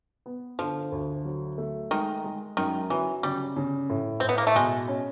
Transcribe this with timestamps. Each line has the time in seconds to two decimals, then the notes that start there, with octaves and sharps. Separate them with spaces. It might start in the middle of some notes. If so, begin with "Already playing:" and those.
0.26 B3
0.59 D3 F3
0.92 D2
1.25 F#3
1.58 A3
1.91 D#3 G#3
2.25 G#3
2.57 F#2 D#3
2.90 E3 F#3
3.23 C#3 G3
3.56 C#3
3.90 A2
4.20 A2 C4
4.29 B3
4.38 A#3
4.47 A3
4.55 B2 G#3
4.88 C#4